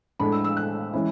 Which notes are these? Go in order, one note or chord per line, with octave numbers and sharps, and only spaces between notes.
A2 G#3 D4 B5
E6
E6
F#6
E3 G#3 C#4 E4